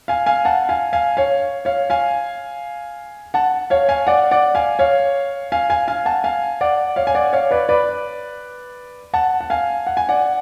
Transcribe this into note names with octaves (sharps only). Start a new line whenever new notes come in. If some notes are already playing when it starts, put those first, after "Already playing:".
F5 G#5
F5 G#5
F#5 A5
F5 G#5
F5 G#5
C#5 F5
C#5 F5
F5 G#5
F#5 A5
C#5 F5
F5 G#5
D5 F#5
D5 F#5
F5 G#5
C#5 F5
F5 G#5
F5 G#5
F5 G#5
F#5 A5
F5 G#5
D5 F#5
C#5 F5
G#5
D5 F#5
C#5 F5
B4 D5
B4 D5
F#5 A5
F#5
F5 G#5
F#5
G#5
D5 F#5